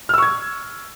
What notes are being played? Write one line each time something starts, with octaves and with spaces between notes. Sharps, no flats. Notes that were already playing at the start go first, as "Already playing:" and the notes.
C#6 E6 F6 G#6